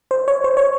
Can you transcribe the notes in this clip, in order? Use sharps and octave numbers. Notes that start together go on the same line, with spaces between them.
C5
C#5
C5
C#5